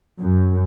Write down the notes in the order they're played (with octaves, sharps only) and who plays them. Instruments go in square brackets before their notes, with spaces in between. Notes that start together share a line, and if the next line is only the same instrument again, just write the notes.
[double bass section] F#2